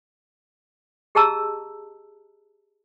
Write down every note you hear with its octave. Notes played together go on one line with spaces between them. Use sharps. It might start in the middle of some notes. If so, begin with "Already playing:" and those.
G4 G#4 D#5 A5 A#5 E6